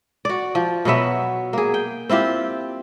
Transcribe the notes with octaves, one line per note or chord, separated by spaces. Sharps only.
F#4 D5
F3
B2 F#3 B3 E5
A#3 G#4
G5
C4 E4 F4 G4